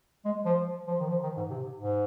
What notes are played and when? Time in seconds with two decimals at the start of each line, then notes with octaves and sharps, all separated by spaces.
0.25 G#3
0.45 F3
0.87 F3
1.00 D#3
1.09 F3
1.23 D#3
1.37 G#2
1.50 C3
1.78 G#2